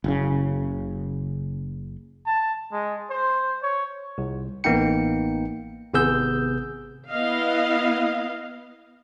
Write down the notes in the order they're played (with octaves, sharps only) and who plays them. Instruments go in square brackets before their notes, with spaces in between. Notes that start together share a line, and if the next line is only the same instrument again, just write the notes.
[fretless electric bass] F#1 C#3
[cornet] A5
G#3
C5
C#5
[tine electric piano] C2
A1 A#3 B3 D#4 G5 C#7
G#1 C3 B3 G#4 E6 G6
[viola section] B3 E4 D#5 F5